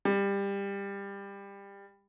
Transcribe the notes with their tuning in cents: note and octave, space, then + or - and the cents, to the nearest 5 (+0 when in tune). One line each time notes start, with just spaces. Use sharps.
G3 +20